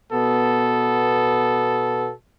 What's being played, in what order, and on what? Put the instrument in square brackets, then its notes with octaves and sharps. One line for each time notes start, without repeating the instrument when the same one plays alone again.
[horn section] B2 B3 A4